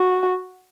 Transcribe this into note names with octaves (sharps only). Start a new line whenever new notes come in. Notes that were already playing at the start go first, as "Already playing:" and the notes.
Already playing: F#4